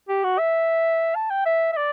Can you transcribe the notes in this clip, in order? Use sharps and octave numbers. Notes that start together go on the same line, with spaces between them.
G4
F#4
E5
A5
G5
E5
E5
D5